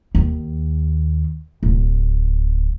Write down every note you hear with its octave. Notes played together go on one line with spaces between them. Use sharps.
D#2
D1